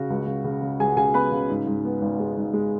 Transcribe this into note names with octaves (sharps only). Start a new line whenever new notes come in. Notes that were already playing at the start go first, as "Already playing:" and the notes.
Already playing: C#3 F#4
C#2
C#3
C#3
C#3
C#2 G#4 G#5
F#5
C#3 G#4 G#5
B3 B4 B5
C#3
G#2
G#2
B3
G#1
G#3
G#2
G#3